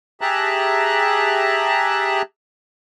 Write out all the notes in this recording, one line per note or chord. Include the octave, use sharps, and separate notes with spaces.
G4 G#4 E5 A5 A#5 F#6